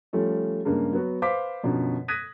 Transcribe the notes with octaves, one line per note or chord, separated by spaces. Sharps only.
F3 G3 A3 C#4
G2 C#3 G#3 A#3
F#3 B3 F#4
B4 C5 F5 D6 B6
F#2 B2 D3 F3
D#6 F#6 G#6 A#6 B6 D#7